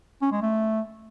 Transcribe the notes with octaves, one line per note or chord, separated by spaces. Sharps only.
C#4
G#3
A3